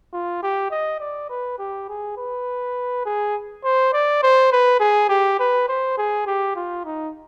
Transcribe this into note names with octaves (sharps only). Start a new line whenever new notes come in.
F4
G4
D#5
D5
B4
G4
G#4
B4
G#4
C5
D5
C5
B4
G#4
G4
B4
C5
G#4
G4
F4
D#4